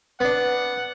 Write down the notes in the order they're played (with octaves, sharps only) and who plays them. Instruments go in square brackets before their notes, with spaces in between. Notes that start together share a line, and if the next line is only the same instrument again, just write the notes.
[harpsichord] B3 D4 [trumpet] F#5